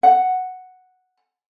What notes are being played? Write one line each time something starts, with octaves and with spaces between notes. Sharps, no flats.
F#5